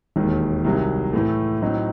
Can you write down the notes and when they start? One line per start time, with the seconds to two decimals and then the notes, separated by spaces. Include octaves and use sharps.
0.16 E1 D#2 D#3
0.64 C2 C3 D#3 F#3
1.13 A2 E3 A3
1.61 A2 F#3 C4 D#4